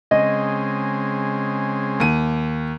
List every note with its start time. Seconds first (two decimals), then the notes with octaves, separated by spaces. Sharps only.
0.11 C#3 G#3 C4 D#5
2.00 D#2 D#7